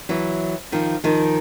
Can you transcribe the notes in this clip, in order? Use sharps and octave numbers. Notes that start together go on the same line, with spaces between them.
E3 F#3
D#3 F3
D#3 F3